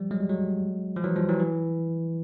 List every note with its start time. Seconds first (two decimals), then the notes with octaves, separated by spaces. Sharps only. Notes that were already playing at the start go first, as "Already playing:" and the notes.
Already playing: F3 G3
0.11 F#3 G#3
0.21 G3
0.29 F#3 G#3
0.97 F3
1.04 E3 F#3
1.16 F3 G3
1.28 E3 F#3
1.40 E3